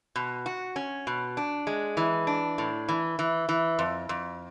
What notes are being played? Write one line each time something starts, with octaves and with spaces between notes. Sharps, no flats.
B2
F#4
C#4
B2
D4
G#3
E3
D4
A2
E3
E3
E3
F2
F2